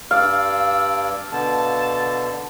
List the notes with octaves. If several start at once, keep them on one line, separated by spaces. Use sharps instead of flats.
G2 D5 F5 E6
B2 D3 A5